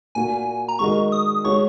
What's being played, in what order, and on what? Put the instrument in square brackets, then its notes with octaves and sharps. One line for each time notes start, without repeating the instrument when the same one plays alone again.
[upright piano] A#2 A#3 F#4 [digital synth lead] G#5
[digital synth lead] A#5
[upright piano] D#3 G#3 F#4 A#4 D#5 [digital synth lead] C#6
[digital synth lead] D#6
[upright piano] G#3 F#4 C#5 [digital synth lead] C#6